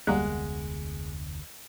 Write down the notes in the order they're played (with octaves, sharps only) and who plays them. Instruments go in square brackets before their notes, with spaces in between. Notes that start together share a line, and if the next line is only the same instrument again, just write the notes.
[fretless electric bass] F1 D2 B3 [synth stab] G3 A#3 F#5 [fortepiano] G#3